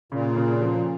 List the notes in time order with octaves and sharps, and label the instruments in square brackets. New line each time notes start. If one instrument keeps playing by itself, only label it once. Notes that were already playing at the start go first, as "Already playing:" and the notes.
[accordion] A#2 [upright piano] C#3
[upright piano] C#3
F3